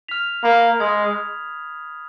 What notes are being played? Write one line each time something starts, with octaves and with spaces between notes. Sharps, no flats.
F6 B6 F7
A#3 B5 F6 B6
G#3 B5 D#6 G#6